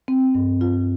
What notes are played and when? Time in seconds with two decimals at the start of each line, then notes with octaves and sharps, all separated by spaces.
0.08 C4
0.35 G2
0.61 F4